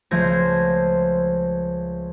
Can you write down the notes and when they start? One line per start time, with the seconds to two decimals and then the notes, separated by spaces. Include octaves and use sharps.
0.11 C#2 F3 A3 C5 G#6 A#6